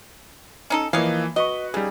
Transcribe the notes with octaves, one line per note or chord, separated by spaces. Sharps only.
C#4 D#4 A4
E3 F3 A#3 C#5 D#5 F5
F#4 B4 D#5 C#6
C#3 G3 D#4 G#4